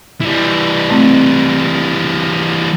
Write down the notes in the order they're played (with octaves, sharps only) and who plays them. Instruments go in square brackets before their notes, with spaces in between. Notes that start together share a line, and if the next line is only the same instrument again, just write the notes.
[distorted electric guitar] E3 G3
[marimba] A3 C4